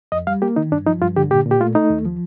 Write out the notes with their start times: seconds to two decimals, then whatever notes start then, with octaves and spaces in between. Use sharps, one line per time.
0.12 F2 D#5
0.27 G3 F5
0.42 A#3 G4
0.56 D#3 D#4
0.72 G2 D4
0.87 F3 D#4
1.01 G2 F4
1.16 D3 G4
1.31 A#2 G4
1.46 A#2
1.51 G4
1.60 A3 F4
1.75 A3 D#4
1.90 D#2
2.05 F3